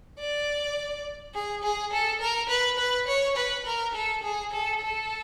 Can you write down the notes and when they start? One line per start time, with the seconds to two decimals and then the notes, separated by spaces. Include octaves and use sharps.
0.19 D5
1.34 G#4
1.63 G#4
1.92 A4
2.21 A#4
2.49 B4
2.79 B4
3.07 C#5
3.36 B4
3.66 A#4
3.94 A4
4.23 G#4
4.52 A4
4.81 A4